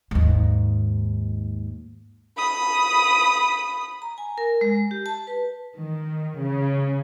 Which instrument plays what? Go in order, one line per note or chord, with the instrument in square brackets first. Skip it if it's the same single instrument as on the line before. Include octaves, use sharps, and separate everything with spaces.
[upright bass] D#2 G#2
[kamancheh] B5 D#6
[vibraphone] A#5
G#5
A#4
G#3
G4
A5
B4
[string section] D#3
C#3